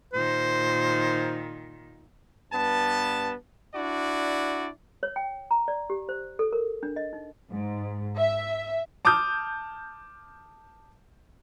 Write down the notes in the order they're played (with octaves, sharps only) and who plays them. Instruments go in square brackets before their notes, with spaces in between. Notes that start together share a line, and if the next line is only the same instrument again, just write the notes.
[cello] A#2 D#3 [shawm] C5
[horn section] G2 B3 A5
D4 E4 F#4 D5
[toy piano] C#5
G5
A#5
D5
G4
C5
A4
A#4
D4
D#5
D#4
[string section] G#2
E5
[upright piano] A5 D6 D#6 F6 G6